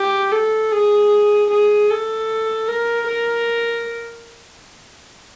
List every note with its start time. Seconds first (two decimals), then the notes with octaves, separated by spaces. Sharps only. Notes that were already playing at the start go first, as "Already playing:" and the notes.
Already playing: G4
0.32 A4
0.72 G#4
1.50 G#4
1.90 A4
2.68 A#4
3.08 A#4